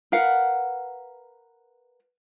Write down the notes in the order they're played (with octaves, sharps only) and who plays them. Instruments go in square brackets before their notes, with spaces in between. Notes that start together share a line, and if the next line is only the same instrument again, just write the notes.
[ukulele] A#4 B4 F5 F#5